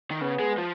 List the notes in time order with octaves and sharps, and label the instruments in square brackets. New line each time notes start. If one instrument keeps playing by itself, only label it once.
[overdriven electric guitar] D#3
[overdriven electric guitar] C#3 [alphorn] B3
[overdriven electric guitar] G#3
F3